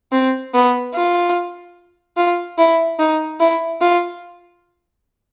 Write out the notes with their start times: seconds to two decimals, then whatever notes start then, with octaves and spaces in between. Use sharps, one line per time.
0.12 C4
0.54 B3
0.95 F4
2.17 F4
2.58 E4
2.99 D#4
3.40 E4
3.81 F4